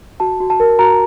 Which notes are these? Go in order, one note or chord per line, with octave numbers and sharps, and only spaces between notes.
F#4 A5
F#4
A5
A#4
F#4 A#5